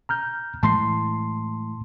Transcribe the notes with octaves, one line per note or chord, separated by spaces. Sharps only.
A#5 F6 G6
A2 E3 G#3 A5 C6 C7